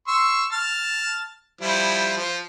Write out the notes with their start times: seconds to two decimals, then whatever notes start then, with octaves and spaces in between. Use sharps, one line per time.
0.08 C6 C#6 E6
0.52 A5 F6
1.61 F3 G3 E4
2.17 F3